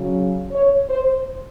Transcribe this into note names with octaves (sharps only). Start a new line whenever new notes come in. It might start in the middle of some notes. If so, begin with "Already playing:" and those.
Already playing: C#3 F#3
C#5
C5